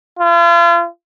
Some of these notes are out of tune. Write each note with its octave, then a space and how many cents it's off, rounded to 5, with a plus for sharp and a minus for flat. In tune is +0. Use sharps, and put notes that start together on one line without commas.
F4 -40